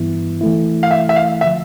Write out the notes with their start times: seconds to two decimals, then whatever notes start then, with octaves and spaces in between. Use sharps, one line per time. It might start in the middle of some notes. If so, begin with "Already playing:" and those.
Already playing: G2 E3 B3 E4
0.41 E3 A3 E4
0.83 F5
0.91 E5
1.09 E5
1.16 F5
1.41 D3 F3 E5